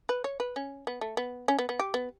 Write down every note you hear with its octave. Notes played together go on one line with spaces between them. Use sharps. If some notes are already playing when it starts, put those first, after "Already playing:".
B4
C#5
B4
C#4
B3
A3
B3
C#4
B3
B3
G4
B3